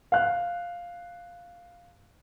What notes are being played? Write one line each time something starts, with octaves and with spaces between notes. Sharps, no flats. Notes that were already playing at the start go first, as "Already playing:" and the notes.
F5 F#6